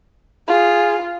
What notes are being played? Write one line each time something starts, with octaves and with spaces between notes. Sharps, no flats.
F4 G#4